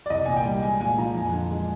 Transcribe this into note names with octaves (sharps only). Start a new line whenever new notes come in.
D5
C2 D#5
A#2 G#5
G5
G3
G#3 G#5
A#2 G#5
F3 A#5
F2 G#5
D3
G#3